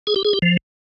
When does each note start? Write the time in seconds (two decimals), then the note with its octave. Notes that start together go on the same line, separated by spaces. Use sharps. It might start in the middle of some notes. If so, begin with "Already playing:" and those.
0.07 G#4
0.16 G4
0.25 G#4
0.33 G4
0.42 F3